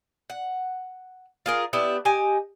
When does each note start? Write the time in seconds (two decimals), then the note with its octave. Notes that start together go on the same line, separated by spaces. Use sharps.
0.30 F#5
1.46 F4 G#4 A#4
1.73 B3 D4 E4 G4
2.05 G4 D#5 G#5